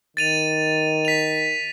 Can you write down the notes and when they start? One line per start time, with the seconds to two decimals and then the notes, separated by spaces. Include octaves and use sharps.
0.17 D#3 A6 D#7 F7
1.05 B6 F7